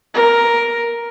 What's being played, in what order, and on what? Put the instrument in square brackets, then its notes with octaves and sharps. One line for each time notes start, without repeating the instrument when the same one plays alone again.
[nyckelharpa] A#4